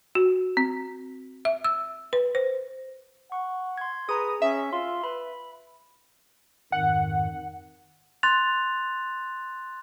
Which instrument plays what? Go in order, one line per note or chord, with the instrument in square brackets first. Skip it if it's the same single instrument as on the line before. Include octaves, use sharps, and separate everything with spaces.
[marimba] F#4
C4
E5
E6
B4
C5
[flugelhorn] F#5 [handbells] C#6
[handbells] C6 G#6
[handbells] G#4 A#5 [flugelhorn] B4 [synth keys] D#6
[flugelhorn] C#4 [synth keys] E5
[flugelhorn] F4 [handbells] C6
[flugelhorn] B4 [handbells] B5
[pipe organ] F2 G#2 D#3 [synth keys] F#5
[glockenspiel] C6 F#6 A6 F7